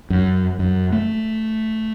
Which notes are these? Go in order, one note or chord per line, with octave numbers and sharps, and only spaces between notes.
F#2
F#2
A3